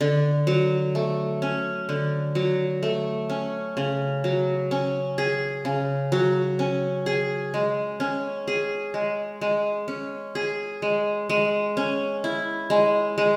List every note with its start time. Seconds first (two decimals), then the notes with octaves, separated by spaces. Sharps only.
0.01 D3
0.47 F#3
0.95 A3
1.42 C#4
1.89 D3
2.35 F#3
2.83 A3
3.30 C#4
3.77 C#3
4.24 F#3
4.71 C#4
5.18 G#4
5.65 C#3
6.12 F#3
6.59 C#4
7.06 G#4
7.54 G#3
8.00 C#4
8.47 G#4
8.94 G#3
9.41 G#3
9.88 C#4
10.35 G#4
10.82 G#3
11.29 G#3
11.77 C#4
12.24 E4
12.70 G#3
13.18 G#3